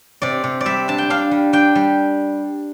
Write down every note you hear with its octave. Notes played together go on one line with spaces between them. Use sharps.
C3 D5
C3
D5
G3 E5
D4 A5
G5
D4 F5
G3
D4 G5
G3